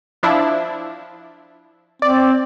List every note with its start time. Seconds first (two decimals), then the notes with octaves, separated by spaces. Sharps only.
0.23 F3 D4 E4
2.02 C4 D5